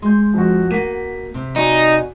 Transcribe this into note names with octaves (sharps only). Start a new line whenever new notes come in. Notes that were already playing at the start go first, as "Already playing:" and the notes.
G#3 C6 G6
F2 F#4
A#3 F#4 B6 D#7
C3
D#4 F#4 D5 G#5